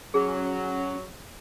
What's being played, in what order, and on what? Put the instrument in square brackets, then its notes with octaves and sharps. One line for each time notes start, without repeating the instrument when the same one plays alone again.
[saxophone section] F#3 [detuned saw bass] C#4 [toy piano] G#4